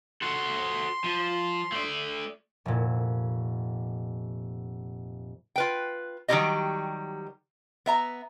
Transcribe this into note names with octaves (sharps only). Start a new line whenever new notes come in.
F#4 A4 C6
F3
A3 D5
F1 A#2
F4 B4 G5
D#3 F#3 G3 E4 G4 D#5
B3 E5 A#5